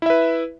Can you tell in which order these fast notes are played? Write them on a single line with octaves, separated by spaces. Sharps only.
E4 E5 B4